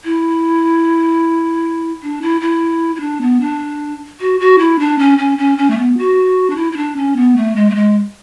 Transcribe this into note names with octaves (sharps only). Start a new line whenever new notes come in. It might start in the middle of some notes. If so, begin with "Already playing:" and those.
E4
D4
E4
E4
E4
D4
B3
D4
F#4
F#4
E4
D4
C#4
C#4
C#4
C#4
A3
B3
F#4
D4
E4
E4
D4
C#4
B3
A3
G#3
A3
G#3